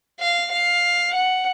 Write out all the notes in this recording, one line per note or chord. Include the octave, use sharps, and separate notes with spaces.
F5
F5
F#5